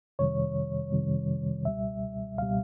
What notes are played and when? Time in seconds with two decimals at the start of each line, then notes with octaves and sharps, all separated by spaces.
0.19 F2 C3 D#3 G3 C#5
0.92 F2 C3 D#3 G3
1.65 C#2 B2 G3 E5
2.38 C#2 B2 G3 F5